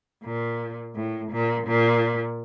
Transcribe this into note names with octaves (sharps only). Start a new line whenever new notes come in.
A#2
A2
A#2
A#2